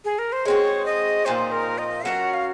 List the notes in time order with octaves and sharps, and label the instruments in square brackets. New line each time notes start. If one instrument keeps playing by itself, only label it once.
[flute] G#4
A#4
C5
[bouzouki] G#3 C4 F#4 [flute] C#5
[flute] D#5
[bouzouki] A#2 F3 C4 D#4 [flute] C5
[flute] A#4
D#5
[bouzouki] F#3 C#4 F#4 A#4 [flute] F#5
[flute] F5